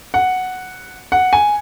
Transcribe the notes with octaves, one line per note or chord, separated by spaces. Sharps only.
F#5
F#5
G#5